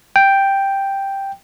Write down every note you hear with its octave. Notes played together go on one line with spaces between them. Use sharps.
G5